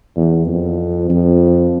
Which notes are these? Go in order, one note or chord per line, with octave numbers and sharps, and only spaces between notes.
E2
F2
F2